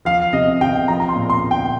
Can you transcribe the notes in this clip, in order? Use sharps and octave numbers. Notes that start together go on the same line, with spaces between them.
F3 F5
C3 D#5
C3 G5
F3 A#5
A#5
C6
A#2
C6
A#2
G5